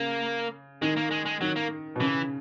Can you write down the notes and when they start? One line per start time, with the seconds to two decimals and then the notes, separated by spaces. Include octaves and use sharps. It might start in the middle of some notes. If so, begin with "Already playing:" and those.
Already playing: C#3 A#3
0.82 D#3 G#3
0.97 A#3
1.11 G#3
1.25 G#3
1.41 D#3 F#3
1.56 A#3
1.96 B2
2.00 C#3 E3